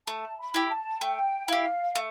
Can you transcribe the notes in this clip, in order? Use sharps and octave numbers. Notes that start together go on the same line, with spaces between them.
A3 A5
B5
E4 G4
A5
A3 G5
E4 G4 F5
A3